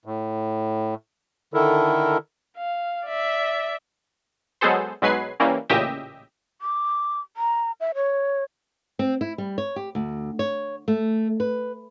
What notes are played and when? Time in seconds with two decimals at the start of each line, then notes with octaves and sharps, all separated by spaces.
0.05 A2
1.54 D3 D#3 E4 A4 A#4
2.57 F5
3.06 D5 E5
4.61 F#3 G#3 B3 G#4 A4 C5
5.02 B1 F#3 G#3 B4 G#6 C7
5.40 E3 G3 A#3 C#4
5.69 A1 A#2 C#3 G4 D#5 E5
6.62 D6
7.37 A#5
7.80 E5
7.95 C#5
8.99 C4
9.21 E4
9.38 G3
9.58 C#5
9.76 G4
9.95 D2
10.39 C#5
10.88 A3
11.40 B4